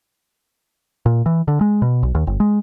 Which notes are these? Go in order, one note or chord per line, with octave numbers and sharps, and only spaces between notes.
A#2
E3
D3
G#3
B2
B1
D#2
G1
G#3